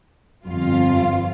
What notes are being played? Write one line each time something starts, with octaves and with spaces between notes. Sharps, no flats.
G1 F2 F4